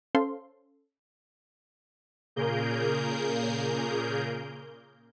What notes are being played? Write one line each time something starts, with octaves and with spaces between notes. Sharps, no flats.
C#4 A4 C5 F5 C6
A#2 C#3 A#3 G#4 A#4 G6